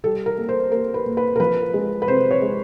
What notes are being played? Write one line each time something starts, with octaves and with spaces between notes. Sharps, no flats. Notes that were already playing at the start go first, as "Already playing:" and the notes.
G3 A4
A#4
A#3
C5
A#3 A#4
B4
A#2
B4
A#4
F3 B4
G#3
B4
C3 C5
C#5
G#3